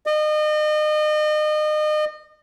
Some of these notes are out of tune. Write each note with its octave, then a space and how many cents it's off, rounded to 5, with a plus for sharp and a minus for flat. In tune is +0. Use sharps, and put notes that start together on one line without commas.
D#5 -35